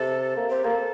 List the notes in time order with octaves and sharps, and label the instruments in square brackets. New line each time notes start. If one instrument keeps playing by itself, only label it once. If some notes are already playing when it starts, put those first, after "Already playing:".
Already playing: [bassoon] C3 [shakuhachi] A4
[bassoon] A#3
[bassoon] C4 [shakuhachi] G4
[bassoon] A#3 [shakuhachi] A4